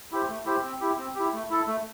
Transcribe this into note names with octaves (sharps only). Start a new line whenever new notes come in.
E4 G4 C5
A3
E4 G4 C5
C4
E4 G4
C4
E4 G4
A3
E4 A4
A3